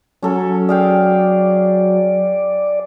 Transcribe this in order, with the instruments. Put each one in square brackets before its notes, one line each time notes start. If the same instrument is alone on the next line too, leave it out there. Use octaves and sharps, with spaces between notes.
[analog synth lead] F#3 [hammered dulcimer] C#4 A4 C#5
[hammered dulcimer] G#4 F5 G5 [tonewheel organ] D5